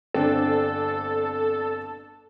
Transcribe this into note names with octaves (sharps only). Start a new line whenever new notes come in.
G1 C4 D4 A4